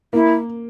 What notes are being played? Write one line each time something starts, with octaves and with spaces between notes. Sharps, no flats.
A#3 E4